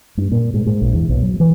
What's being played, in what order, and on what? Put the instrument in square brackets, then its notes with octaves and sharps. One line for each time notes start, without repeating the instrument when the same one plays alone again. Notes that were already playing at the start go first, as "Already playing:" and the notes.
[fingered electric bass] G2
A#2
G#2
G#2
A#1
E2
B1
F#3
E3